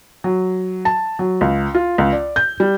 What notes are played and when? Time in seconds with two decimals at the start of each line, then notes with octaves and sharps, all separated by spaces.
0.24 F#3
0.85 A5
1.19 F#3
1.41 C#2
1.75 F4
1.98 C#2
2.12 D5
2.36 G6
2.60 G3